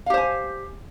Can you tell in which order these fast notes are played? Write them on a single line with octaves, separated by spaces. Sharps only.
F5 G4 C5 G#5